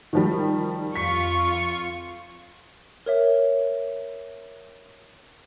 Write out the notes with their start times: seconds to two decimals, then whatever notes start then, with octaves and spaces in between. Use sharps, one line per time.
0.13 D#3 F3 G3
0.96 F2 F4 C#6 B6
3.06 A#4 C#5 E5